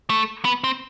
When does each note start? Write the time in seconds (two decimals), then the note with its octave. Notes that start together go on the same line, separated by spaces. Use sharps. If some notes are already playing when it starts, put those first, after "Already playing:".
0.10 A3
0.45 B3
0.64 C4